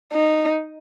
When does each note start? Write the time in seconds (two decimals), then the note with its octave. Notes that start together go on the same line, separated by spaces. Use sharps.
0.13 D#4